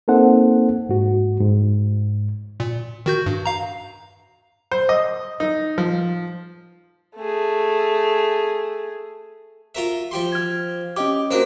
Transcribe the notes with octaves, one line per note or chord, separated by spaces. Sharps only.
A#3 C4 D#4 A4 C5 F#5
G#2 F#4
G#2
A#2
D#3 F#4 G6
G2
F5 A#5
C5
D#5
D#4
F3
A3 G#4
F4 A#4 E5
F3 G4 C6
F6 G#6
C#4 G4 D#5 D6
A#3 D4 F#4 A#4 C5